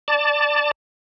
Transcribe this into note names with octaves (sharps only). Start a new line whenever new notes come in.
D5 A5